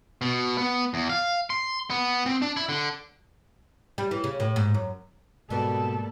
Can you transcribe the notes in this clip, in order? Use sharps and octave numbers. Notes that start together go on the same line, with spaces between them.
B2
B3
E2
F5
C6
B3
C4
D4
E4
D3
G3
E3
C#3
A2
G#2
F#2
G#2 B2 G3 A#3 B3 A4